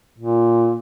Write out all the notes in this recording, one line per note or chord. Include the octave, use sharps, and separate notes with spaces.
A#2